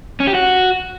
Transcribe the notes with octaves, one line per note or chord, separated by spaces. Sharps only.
C#4
G4
F#4